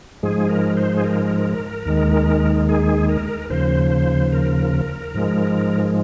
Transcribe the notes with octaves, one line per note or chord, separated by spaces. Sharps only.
G#2 F3 G#3 G#4
A#4
C5
G#4
A#4
D#2 D#3 G#3
G#4
A#4
D#2 C#3 F3 C5
C5
A#4
G#2 F3 G#3